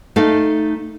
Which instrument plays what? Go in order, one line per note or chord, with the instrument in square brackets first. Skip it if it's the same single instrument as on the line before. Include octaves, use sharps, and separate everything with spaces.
[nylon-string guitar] A3 D#4 A4 F5